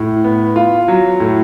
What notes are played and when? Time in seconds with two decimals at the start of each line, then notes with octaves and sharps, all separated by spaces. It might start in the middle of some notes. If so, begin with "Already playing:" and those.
Already playing: A2
0.24 B3
0.56 F4
0.88 F#3
1.20 A2